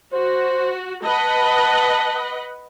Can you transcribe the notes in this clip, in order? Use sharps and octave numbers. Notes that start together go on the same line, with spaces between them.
F#4 C5
B4 D#5 F#5 A5